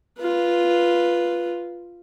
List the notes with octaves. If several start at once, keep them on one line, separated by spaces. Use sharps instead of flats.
F4 B4